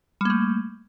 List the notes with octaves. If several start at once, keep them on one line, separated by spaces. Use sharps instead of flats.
G3 A3 A#3